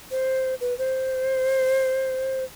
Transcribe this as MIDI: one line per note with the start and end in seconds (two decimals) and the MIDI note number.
0.11 0.55 72
0.61 0.76 71
0.78 2.44 72